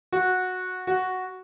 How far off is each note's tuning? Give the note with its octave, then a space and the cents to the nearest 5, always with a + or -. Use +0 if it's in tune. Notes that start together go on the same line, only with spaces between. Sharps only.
F#4 -10
F#4 +0